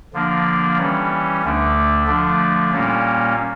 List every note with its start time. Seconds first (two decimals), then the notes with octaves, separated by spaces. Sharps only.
0.13 D3 F3 A#3 D4
0.77 E3 G3 C#4
1.43 D2 D3 A3 D4
2.06 D3 F3 A3 D4
2.71 A#2 G3 A#3 C#4